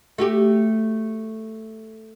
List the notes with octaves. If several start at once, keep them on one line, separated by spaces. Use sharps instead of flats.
A3 F#4 G4